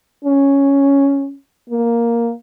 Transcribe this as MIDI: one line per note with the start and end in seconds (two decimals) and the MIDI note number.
0.25 1.34 61
1.70 2.32 58